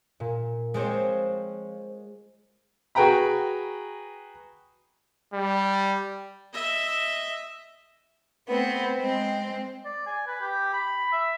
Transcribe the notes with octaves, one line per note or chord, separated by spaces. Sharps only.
A#2
F3 G#3 C4 G4 C5 C#5
F#4 G#4 B4 G5 A#5 B5
G3
D#5 E5
A3 B3 C4
G#3 C4
D5
G#5
B4
G4
B5
E5